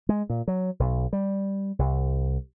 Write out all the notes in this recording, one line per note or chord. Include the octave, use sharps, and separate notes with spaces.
G#3
A#2
F#3
B1
G3
C2